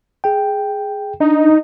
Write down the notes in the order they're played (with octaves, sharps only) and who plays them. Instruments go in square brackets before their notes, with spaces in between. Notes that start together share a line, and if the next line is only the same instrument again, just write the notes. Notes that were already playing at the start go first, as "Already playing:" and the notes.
[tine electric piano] G#4 G5
[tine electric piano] D4 [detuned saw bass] D#4